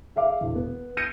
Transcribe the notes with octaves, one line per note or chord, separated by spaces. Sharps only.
G#4 E5 F5 D6
E1 E2
B3
G6 G#6 A#6 C7 C#7 D#7